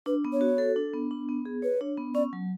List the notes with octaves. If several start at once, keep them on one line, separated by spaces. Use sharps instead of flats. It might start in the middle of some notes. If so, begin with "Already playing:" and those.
D4 B4
B3
C#5
F#4
A4
D4
B3
D4
B3
G#4
B4 C#5
D4
B3
C#4 D5
F#3